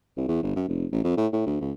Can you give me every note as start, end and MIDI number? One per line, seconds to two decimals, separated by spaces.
0.17 0.24 36
0.28 0.39 40
0.43 0.54 31
0.56 0.64 42
0.69 0.86 29
0.92 1.01 33
1.04 1.17 41
1.17 1.27 45
1.33 1.46 45
1.46 1.59 38
1.61 1.72 37